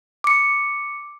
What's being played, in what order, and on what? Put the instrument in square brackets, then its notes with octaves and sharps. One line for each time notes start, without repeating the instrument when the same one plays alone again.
[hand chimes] D6 C#7